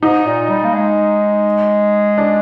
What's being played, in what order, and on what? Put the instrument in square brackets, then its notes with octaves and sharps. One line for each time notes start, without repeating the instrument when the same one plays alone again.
[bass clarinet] G#2 [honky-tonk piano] D#4
[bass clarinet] A#2
G3
A#3
G#3
[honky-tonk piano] D4